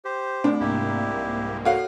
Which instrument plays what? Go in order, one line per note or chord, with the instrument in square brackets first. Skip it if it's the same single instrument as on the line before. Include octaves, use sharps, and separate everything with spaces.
[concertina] G4 C5
[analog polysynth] B2 [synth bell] A3 C4 [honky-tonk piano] D4
[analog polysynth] C2 G#2 A#3 [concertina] E4 G4
[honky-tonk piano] F#4 F5 [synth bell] A4 C#5